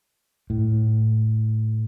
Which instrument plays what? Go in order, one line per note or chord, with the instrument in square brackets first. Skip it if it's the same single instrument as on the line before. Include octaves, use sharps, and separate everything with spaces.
[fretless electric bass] A2